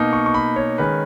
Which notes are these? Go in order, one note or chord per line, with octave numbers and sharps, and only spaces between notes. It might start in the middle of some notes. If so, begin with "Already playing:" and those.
Already playing: B2 A#3 D#4
C#6
C#6
B5
C#5
D#3 G#3 C#4 B4